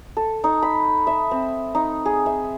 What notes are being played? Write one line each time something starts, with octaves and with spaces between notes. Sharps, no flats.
A4
D#4
B5
E5
C4
D#4
G#4
E5